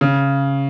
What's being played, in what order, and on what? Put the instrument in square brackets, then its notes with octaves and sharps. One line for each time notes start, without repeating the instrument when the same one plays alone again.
[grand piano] C#3